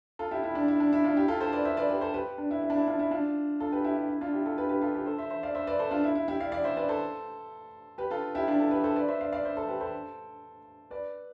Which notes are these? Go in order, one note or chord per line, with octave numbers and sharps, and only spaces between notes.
F4 A4
E4 G4
E4
D4
E4
D4
E4
D4 F4
E4 G4
F4 A4
A4 C5
B4 D5
C5 E5
B4 D5
G4 B4
A4 C5
G4 B4
D4
E4
E4
D4
E4
D4 F4
E4
D4 F4
F4 A4
G4 B4
E4 G4
E4
E4
D4 F4
E4 G4
F4 A4
G4 B4
G4 B4
F4 A4
G4 B4
A4 C5
C5 E5
C5 E5
D5 F5
C5 E5
B4 D5
A4 C5
D4 F4
E4
E4
E4 G4
D5 F5
D5 F5
C5 E5
B4 D5
A4 C5
G4 B4
F4 A4
E4 G4
D4 F4
F4 A4
G4 B4
A4 C5
B4 D5
C5 E5
D5 F5
D5 F5
C5 E5
A4 C5
G4 B4
A4 C5
B4 D5